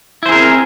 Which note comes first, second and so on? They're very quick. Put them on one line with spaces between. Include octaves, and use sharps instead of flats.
E4 C5 G#4 A#4 C4